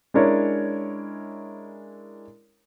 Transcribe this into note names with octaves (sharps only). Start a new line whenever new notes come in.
G#3 C#4 D4 E4 A#4 C#5